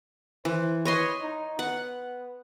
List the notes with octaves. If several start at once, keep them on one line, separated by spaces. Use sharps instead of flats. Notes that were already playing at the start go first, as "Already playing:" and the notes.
E3 C5
B4 C#5 D#5 C6
D#4
B3 F#5